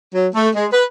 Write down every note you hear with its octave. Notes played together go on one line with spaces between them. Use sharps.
F#3
A3
G#3
B4